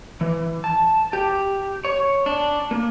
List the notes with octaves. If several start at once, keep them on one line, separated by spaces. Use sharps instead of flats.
E3
A5
G4
C#5
D4
A#3